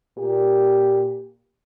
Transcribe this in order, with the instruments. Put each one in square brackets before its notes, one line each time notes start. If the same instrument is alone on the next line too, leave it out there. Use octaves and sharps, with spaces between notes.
[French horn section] A#2 G4